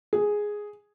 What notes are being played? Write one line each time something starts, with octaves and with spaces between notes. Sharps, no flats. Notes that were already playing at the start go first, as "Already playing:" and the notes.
G#4